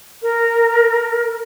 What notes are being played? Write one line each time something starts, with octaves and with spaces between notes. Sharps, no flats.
A#4